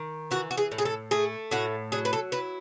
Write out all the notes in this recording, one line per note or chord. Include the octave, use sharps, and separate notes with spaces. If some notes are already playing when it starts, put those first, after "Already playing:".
Already playing: D#3
E3 F#4
F#4
G#4
A2
G#4
A4
A3 G#4
A2 F#4
F#3 G#4
B4
A4
E4 B4